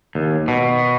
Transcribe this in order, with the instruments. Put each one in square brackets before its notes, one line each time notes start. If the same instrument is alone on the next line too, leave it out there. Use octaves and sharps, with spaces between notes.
[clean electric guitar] D#2
B2